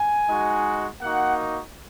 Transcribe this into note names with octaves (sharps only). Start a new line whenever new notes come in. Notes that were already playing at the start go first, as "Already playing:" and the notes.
Already playing: G#5
G#3 D#4 F#4
A#3 D#4 F#4 F#5